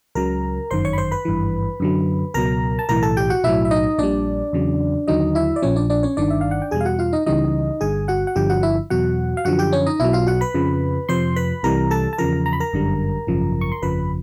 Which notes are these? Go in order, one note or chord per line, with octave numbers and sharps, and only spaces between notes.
C#2 C#3 F#3 A#4 A#5
G1 F#2 D#3 C5 C6
C#5 C#6
B5
C5 C6
B4 B5
G#1 G2 E3
F#2 D3 F#3
C#2 B2 F#3 A#4 A#5
A5
B1 A2 E3 A#4 A#5
A4 A5
G4 G5
F#4 F#5
B1 A2 F#3 E4 E5
E5
D#4 D#5
A#1 A#2 G3 D4 D5
E2 C#3 F#3
D#2 D3 F#3 D#4 D#5
E4 E5
D5
A#1 A#2 F3 C#4 C#5
D4 D5
D4 D5
C#4 C#5
G1 G2 D#3 D4 D5
E5
F5
F#5
G5
E2 B2 G3 G#4 G#5
F5
F#4 F#5
F4 F5
D#4 D#5
C#2 C#3 E3 G3 D#4 D#5
G1 G2 D3 G#4 G#5
F#4 F#5
F#5
G1 G2 D3 F3 G4 G5
F#4 F#5
E4 E5
E2 B2 F#3 F#4 F#5
F5
F#2 D3 F3 F#4 F#5
G4 G5
C#4 C#5
D#4 D#5
B1 B2 F#3 E4 E5
F4 F5
F#4 F#5
B4 B5
F2 C#3 F3
F2 C3 F3 C5 C6
B4 B5
C2 C3 E3 G3 A#4 A#5
A4 A5
A5
E2 C#3 F3 A#4 A#5
A#5
B5
A#4 A#5
G1 F#2 D3 G3
G#1 F#2 C#3 F3
C#6
C6
G1 F2 C#3 F3 B4 B5